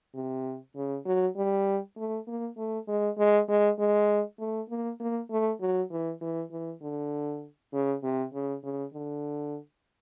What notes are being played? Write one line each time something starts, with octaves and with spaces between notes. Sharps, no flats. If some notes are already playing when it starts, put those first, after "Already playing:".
C3
C#3
F#3
G3
A3
A#3
A3
G#3
G#3
G#3
G#3
A3
A#3
A#3
A3
F#3
E3
E3
E3
D3
C#3
C3
C#3
C#3
D3